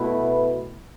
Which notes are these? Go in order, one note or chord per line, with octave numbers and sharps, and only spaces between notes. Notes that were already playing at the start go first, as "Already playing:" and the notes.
Already playing: B2 A3 E4 B4